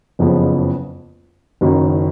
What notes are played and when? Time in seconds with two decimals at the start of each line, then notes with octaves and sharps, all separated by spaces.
0.19 F#1 F2 C#3 F3 B3
1.61 F#1 F#2 D#3